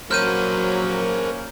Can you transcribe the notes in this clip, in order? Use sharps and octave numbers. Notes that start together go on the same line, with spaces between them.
F#3 A#3 C#4 A#4 C5 F6 G6 D#7